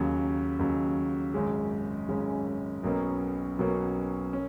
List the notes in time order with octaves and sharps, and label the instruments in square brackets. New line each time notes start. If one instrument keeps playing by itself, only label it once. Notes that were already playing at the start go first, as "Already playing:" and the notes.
Already playing: [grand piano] D#2 C#3 F#3
D#2 C#3 F#3
G#1 F#2 C#3 G#3 C#4
G#1 F#2 C#3 G#3 C#4
B1 B2 F#3 A#3 C#4
B1 B2 F#3 A#3 C#4
C#4